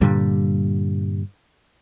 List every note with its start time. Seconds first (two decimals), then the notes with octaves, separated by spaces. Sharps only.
0.01 G2 A#2 D3 G3